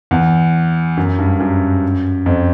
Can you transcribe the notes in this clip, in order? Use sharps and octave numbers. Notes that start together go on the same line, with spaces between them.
E2
F#2
G2
F#2
F2